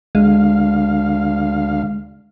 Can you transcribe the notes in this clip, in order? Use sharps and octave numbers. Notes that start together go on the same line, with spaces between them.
D2 G#3 F5